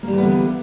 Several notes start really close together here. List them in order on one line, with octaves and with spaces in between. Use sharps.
A#3 G3 E3 B3 D3